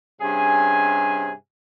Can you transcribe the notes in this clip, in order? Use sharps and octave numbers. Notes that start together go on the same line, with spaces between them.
G2 C3 C#4 G#4 G#5